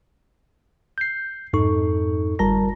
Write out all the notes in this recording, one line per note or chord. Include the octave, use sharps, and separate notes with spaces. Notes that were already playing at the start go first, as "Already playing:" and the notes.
G6 C7
F2 G#2 D#4 A4 C#6
G1 G3 A#4 A5 A#5 A#6